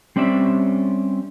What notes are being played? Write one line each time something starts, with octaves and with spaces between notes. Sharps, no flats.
G3 C4 C#4 D5 E5